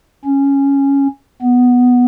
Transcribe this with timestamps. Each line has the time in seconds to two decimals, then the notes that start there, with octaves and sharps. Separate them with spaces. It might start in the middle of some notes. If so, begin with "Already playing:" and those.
0.25 C#4
1.42 B3